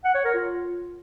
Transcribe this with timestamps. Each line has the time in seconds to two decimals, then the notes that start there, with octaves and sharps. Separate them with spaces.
0.05 F#5
0.14 C#5
0.24 A#4
0.34 F4